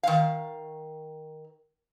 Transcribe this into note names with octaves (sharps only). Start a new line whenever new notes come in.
D#3 F5